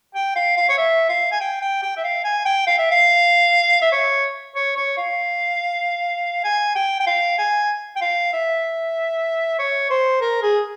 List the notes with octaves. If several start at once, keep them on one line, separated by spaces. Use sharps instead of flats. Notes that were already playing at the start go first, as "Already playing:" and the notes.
G5
F5
F5
C#5
E5
F5
G#5
G5
G5
G5
E5
F5
G#5
G5
F5
E5
F5
E5
C#5
C#5
C#5
F5
G#5
G5
G5
F5
G#5
G5
F5
E5
C#5
C5
A#4
G#4